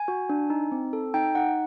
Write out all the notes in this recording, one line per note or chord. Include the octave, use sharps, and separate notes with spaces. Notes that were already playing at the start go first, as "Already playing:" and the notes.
Already playing: G#5
F#4
D4
D#4
C4
A4
D#4 G5
D#4 F#5